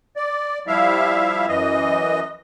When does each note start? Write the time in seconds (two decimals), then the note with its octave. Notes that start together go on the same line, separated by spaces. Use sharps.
0.16 D5
0.67 F3 G3 E4 E5 F5
1.48 F#2 E3 D#5